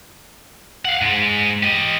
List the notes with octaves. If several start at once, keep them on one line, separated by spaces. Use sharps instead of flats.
F5 F#5
G#2 G#3
G4 D#5